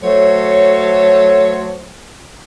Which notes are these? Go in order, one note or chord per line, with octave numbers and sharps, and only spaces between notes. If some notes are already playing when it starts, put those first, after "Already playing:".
F#3 A3 A4 C5 C#5